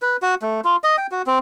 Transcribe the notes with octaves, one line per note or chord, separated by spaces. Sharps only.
B4
F#4
A3
F4
D#5
G5
F#4
C4